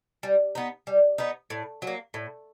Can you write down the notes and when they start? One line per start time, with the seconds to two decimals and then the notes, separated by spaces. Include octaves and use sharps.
0.23 G3
0.55 B3 D#4
0.87 G3
1.18 B3 D#4
1.50 A2
1.82 F#3
1.87 A#3
2.14 A2